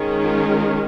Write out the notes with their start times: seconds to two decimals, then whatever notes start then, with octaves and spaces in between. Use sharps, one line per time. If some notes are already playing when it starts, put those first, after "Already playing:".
Already playing: D#3 G#3 C#4
0.21 F4